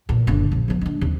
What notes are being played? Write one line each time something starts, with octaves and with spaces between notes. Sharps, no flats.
E2 A#2
F#1 D3
A#1
F3 B3
G#3 D4
D#2 C3